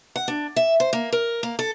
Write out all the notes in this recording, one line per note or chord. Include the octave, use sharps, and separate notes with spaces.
F#5
D4
E5
C5
A#3
A#4
A#3
A4